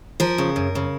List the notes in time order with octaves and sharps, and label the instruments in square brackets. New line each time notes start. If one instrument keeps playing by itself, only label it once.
[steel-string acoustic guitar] F3 A#4
C#3
F#2
C#3